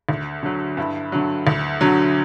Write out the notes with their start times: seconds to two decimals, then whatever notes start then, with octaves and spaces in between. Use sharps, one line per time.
0.09 D2
0.43 D3 F#3
0.77 G2 E4
1.12 D3 F#3
1.47 D2
1.81 D3 F#3